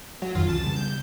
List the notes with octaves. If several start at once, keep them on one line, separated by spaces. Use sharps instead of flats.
F#3
F2 D#3 F4
C2 E3 C#4 A5
C#3 G3 B3
G6